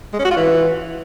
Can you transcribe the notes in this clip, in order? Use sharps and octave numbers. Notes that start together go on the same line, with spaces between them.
G#3
C#4
F#4
F4
E3